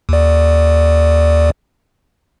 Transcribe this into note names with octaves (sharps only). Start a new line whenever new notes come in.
D#2 D5